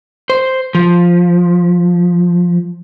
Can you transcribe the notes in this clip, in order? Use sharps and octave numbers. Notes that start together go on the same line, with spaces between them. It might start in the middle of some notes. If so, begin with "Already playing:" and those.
C5
F3